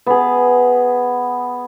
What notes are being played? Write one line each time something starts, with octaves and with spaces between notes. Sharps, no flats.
B3 G#4